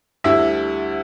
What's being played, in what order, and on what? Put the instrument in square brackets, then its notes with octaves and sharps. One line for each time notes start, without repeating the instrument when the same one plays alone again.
[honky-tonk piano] D2 D3 G3 E4 E5